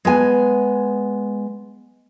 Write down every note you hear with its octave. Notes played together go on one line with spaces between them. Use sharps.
G#3 B3 G#5